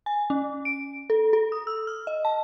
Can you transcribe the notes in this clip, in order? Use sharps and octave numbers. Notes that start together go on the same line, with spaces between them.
G#5
C#4
D7
A4
A4
D#6
E6
F6
D#5
A5